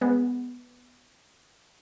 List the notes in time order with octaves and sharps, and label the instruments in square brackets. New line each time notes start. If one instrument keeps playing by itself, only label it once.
[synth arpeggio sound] G#3 B3